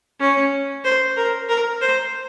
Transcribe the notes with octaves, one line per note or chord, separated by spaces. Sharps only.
C#4
C5
A#4
A#4
C5